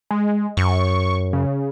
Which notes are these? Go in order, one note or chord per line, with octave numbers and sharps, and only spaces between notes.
G#3
F#2 C#6
C#3